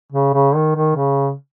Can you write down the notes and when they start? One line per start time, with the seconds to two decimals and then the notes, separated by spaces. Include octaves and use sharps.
0.13 C#3
0.34 C#3
0.55 D#3
0.76 D#3
0.96 C#3